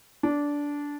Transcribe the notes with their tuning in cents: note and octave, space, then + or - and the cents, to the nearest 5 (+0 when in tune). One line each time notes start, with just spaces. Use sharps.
D4 -15